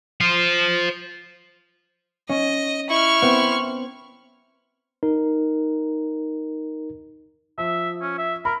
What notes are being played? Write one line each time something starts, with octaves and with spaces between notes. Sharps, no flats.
C5 F5
C#4 D#5
E4 C#6 F6
B3 C4
D#4 A#4
F3 E5
C#4
E5
A#4 B5